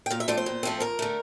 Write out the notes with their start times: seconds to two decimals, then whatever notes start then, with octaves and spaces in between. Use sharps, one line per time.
0.06 G5
0.10 A#2 F5
0.20 E5
0.28 F3 A3 C4 D5
0.37 C5
0.46 A#2
0.63 F3 A3 C4
0.80 F2 A#4
0.99 D3 A3